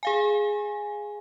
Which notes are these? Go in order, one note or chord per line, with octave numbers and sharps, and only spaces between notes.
G#4 F5 G#5